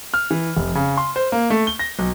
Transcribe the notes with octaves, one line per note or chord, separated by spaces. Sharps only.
F6
E3
F1
C#3
C6
C5
A#3
A3
G7
A#6
B1